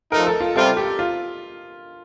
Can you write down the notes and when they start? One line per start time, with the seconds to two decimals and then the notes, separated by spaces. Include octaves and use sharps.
0.12 F3 A3 D#4 A#4
0.27 A4
0.40 F4
0.56 C3 G3 C4 F4 A4
0.77 G4
0.99 F4